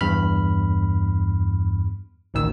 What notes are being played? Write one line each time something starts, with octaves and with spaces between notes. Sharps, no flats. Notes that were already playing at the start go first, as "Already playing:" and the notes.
E2 G2 B5 F6
A1 D2 D#3 E6